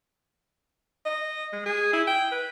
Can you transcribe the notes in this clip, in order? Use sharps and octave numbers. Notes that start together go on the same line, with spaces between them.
D#5
G#3
G#4
E4
G5
B4